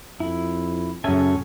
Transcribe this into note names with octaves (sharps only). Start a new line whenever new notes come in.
F2 E4
F#2 C#3 C#4 A4 E5 G#5